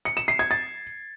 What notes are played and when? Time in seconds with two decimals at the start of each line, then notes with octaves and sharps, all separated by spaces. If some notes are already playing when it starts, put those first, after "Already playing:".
0.05 C#7
0.17 E7
0.28 C7
0.39 G#6
0.51 A6